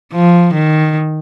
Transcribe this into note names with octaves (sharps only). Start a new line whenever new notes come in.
F3
D#3